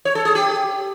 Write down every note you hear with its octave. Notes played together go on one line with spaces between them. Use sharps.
C#5
A4
G#4
G4